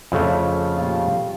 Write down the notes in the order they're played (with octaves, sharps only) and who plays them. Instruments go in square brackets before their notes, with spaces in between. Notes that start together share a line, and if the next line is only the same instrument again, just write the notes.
[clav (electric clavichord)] F2 C#3 A3
[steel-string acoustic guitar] A#2 F4 G4